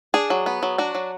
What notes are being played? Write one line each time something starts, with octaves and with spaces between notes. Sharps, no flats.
D4 G#4
F#3
B3
F#3
D4 F#4
F#3